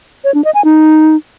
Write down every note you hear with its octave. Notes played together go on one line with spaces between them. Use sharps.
C#5
D4
D#5
G#5
D#4